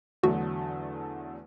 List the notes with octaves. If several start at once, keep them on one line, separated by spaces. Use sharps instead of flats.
E2 D3 F#3 A3 F#4